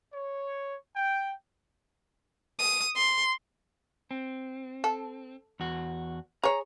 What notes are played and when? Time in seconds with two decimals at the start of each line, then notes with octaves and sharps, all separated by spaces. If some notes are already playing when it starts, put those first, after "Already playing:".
0.13 C#5
0.96 G5
2.59 D#6
2.96 C6
4.11 C4
4.84 A4
5.60 E2 F#4
6.44 G#4 C#5 A#5